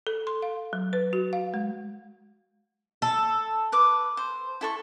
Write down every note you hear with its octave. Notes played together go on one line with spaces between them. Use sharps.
A4
C6
F5
F#3
B4
F#4
F5
G#3
A4
B4 D6
C5
E4 A4 C#6